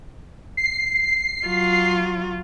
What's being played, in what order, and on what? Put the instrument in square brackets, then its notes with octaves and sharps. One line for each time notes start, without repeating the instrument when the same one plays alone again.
[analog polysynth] C7
[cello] F#3 F4